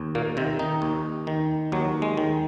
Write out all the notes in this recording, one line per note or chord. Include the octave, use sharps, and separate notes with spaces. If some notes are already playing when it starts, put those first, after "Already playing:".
Already playing: D#2
A#2 A#3
C3 D#3 C4
D#3 D#4
D#2
D#3
D#2 F#3
G#3
D#3